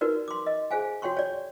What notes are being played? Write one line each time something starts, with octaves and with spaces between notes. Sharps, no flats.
D#4 F#4 A#4 B4 D5
C6 D6
D#5
G#4 C5 F5 G#5
F#4 C#5 G5 C6 C#6
C#5 D5